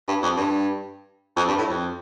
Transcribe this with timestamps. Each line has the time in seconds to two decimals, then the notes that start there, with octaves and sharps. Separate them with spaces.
0.08 G2
0.23 F2
0.37 G2
1.37 F2
1.48 G2
1.58 A2
1.70 F2